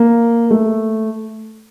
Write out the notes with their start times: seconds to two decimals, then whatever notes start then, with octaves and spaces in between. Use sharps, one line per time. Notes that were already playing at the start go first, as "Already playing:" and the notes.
Already playing: A#3
0.51 A3